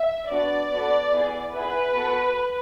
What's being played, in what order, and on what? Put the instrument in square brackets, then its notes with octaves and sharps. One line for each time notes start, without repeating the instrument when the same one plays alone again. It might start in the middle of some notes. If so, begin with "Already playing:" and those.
Already playing: [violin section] E5
B3 D4 F#4 D5
B3 F#4 A4
B3 E4 G#4
B3 E4 G#4 B4
B3 F#4 A4